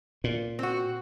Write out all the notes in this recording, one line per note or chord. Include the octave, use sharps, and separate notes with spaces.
A#2
C4 F#4